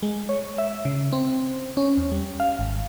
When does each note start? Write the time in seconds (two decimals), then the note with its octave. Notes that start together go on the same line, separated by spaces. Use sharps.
0.03 G#3
0.29 C#5
0.58 E5
0.85 C#3
1.12 C4
1.77 C#4
1.97 E2
2.12 G3
2.40 F5
2.59 G#1